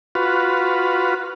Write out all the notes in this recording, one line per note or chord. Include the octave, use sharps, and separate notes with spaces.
F4 F#4 B4